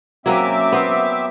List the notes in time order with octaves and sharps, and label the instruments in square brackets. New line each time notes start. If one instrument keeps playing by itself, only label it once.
[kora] F#3 A#3 C#4 [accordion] C4 E5 D6
[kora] B3 C5